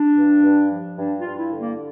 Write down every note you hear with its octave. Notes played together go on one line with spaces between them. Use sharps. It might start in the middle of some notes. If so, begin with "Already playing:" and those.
Already playing: D4
G2
G2
F3
G2 D4
F4
G2
E4
D3
A#3